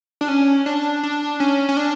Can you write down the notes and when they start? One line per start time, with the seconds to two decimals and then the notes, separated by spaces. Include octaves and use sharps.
0.21 D4
0.28 C#4
0.66 D4
1.03 D4
1.40 C#4
1.69 C#4
1.77 D4